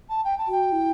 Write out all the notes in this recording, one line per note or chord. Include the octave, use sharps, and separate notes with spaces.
A5
G5
A5
F#4 G5
E4